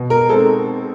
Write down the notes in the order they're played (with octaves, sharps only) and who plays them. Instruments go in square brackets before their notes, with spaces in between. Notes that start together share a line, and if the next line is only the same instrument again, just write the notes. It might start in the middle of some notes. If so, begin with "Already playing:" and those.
Already playing: [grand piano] B2
[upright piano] A#4
[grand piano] G#3 C4 D#4 [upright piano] A4